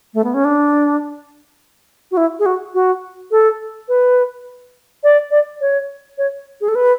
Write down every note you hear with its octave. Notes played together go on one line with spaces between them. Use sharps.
A3
B3
C#4
D4
F#4
E4
G#4
F#4
F#4
A4
B4
D5
D5
C#5
C#5
G#4
A4
B4